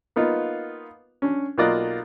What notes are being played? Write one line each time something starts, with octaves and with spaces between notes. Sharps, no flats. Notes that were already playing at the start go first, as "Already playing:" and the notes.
A#3 B3 D#4 F4
C#4 D4
B1 A#3 F4 D5 D#5 F#6